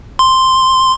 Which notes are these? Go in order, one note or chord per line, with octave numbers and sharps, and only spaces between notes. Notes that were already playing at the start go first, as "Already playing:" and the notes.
C6